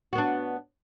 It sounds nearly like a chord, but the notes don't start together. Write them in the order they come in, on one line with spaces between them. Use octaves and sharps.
F#4 B3 D4